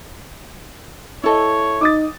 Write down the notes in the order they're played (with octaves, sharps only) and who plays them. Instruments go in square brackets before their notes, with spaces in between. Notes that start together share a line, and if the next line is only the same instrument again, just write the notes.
[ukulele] E4 A4 D#5 [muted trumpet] C#5
[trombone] D#4 [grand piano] D6 D#6 A6